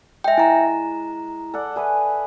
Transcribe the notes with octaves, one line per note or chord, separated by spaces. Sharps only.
G#3 E5 G5
E4 A#5
A4 D5 F#5
G#4 B4 E5